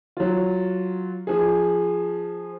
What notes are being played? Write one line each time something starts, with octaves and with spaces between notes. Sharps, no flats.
F#3 F4
F3 G#4